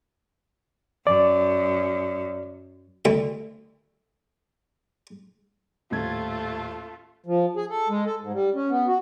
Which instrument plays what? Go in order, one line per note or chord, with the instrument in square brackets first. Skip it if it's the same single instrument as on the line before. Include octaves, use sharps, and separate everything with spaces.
[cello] F#2 [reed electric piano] D5
[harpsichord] D2 E5
[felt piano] D#1 A2 G#6 [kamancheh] A3 F4
[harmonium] F3
G#4
A4
G#3
A4
G#2
G3
C#4
B3
F#4